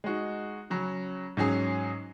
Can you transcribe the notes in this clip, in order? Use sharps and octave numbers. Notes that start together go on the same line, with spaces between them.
G#3 D#4 F#4
C#3 F#3 C#4
G#2 F#3 C#4 G#4